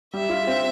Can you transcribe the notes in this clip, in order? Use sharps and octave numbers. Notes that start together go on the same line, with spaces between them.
G3 E5
F4
C4